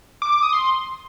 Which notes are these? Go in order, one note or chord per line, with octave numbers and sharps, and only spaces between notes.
D6
D6
D#6
C6